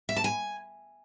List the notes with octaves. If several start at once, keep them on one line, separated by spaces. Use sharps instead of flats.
E5
A5
G#5